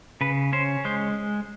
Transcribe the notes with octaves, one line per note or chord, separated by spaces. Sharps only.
C#3 B4
C#4 C5
G#3 C5